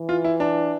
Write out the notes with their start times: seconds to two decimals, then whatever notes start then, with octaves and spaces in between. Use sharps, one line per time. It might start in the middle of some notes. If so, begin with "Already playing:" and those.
Already playing: E3
0.09 F4
0.25 E4
0.40 D4